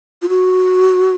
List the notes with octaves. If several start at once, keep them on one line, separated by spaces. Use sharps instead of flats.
F4
F#4